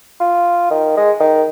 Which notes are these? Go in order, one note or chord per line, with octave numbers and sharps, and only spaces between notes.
F4
D#3
G#3
D#3